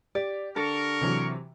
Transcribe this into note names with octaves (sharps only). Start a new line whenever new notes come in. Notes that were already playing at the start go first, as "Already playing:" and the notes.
G4 D5
D3 A4 A#4 C#6
C3 E3 F#3